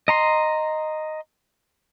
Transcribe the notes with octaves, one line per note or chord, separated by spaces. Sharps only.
D#5 A#5 C6